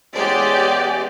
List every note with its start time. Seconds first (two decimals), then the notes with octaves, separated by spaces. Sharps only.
0.14 E2 G#3 C#4 G4 D5